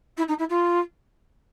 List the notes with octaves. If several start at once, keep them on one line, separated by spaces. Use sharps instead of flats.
E4
D#4
E4
F4